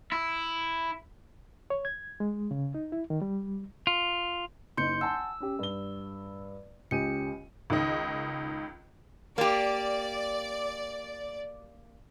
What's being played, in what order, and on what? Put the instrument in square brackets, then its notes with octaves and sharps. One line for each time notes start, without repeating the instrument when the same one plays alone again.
[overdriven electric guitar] E4
[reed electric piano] C#5
G#6
G#3
C#3
D#4
E4
D#3
G3
[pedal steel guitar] F4
[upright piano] F#1 D#4 [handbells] C6 G6 C#7
[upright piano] F#5 G#5 A5 [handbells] E6
[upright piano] C#4 G4
G2 G7
[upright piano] C#2 G4 D#7 [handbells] C#4 C#7
[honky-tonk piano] C#2 D#3 D#5
[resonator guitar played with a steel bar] A#3 G4 [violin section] D5